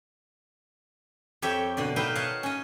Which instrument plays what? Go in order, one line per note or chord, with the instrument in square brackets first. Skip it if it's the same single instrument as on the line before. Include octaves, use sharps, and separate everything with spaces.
[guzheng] F2 G4 C#5 E5 G5
B2 D3 D5
D#4 B4 E5 F5 G5
C#5 D#5 F5 F#5 A5 A#5
C#4 D#5